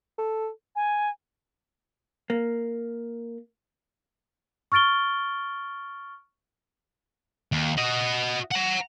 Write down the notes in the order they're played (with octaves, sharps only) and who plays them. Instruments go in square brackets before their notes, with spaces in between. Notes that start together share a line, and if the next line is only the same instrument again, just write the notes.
[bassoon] A4
[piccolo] G#5
[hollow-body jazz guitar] A#3
[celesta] C#6 F6 A6 D7 G7
[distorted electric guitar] D#2
F#4 D#5
F#5 A#5